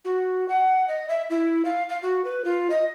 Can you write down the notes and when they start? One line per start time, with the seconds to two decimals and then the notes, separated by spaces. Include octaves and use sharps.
0.05 F#4
0.48 F#5
0.88 D#5
1.09 E5
1.30 E4
1.65 F5
1.89 F5
2.02 F#4
2.24 B4
2.45 F4
2.70 D#5